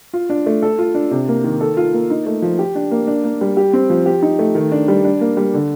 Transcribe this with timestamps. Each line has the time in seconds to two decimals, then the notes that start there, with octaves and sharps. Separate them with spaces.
0.13 F4
0.30 D4
0.46 A3
0.62 A4
0.79 F4
0.95 D4
1.11 C3
1.28 A#3
1.44 D#3
1.60 A4
1.77 F4
1.93 A#3
2.10 D#4
2.26 A3
2.42 F3
2.59 G4
2.75 D4
2.91 A#3
3.07 D4
3.24 A#3
3.41 G3
3.57 G4
3.73 C4
3.90 F3
4.06 G4
4.22 D#4
4.39 A3
4.55 D#3
4.72 D4
4.88 G3
5.04 D4
5.21 A#3
5.37 G3
5.54 D3